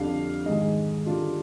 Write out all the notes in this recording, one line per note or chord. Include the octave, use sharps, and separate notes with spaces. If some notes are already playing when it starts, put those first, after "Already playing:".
Already playing: F2 D3 G3 D4 F5
G#2 D#3 G#3 D#5
D3 G3 D4 F4